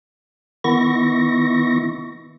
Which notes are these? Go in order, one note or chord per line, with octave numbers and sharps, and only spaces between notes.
D#3 B3 E4 C#6 A#6